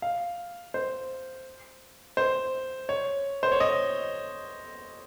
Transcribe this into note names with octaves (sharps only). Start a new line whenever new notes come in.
F5
C5
C5
C#5
C5
C#5
D#5